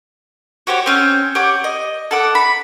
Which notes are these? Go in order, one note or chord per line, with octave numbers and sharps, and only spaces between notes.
F#4 G4 C5 C#5
C4 C#4 G5
G4 C#5 F#5 D6
D#5
A4 F#5 D6
B5